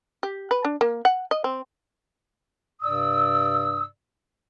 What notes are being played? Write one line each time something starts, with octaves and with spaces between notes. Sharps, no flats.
G4
B4
D4
A#3
F#5
D#5
C4
G2 C3 D5 D#6 E6